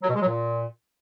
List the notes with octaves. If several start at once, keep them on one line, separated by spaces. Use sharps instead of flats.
F#3
B2
G#3
F#3
A#2